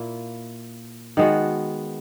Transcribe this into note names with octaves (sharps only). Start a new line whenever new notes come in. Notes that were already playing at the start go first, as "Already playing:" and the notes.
Already playing: A#2 A#3 E4
D#3 G#3 B3 F#4